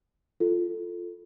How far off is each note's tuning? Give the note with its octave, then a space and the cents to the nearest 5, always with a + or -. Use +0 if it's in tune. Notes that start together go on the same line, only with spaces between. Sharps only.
F4 -5 A4 +0